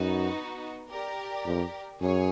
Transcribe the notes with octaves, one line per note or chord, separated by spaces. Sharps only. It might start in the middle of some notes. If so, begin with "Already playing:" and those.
Already playing: F#2 B3 D#4 F#4
G4 A#4 D5
F2
F#2 G#4 C#5